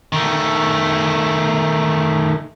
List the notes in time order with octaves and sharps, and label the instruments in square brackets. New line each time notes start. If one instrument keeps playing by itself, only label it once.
[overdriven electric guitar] D#3 A3